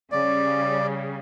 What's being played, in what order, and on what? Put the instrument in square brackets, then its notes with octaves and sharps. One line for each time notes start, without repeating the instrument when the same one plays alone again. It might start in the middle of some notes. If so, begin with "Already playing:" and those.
[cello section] C#3 G3 [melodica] D5